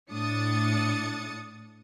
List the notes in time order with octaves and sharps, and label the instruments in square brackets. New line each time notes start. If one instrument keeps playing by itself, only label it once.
[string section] A2 D4 D#6 A6 C#7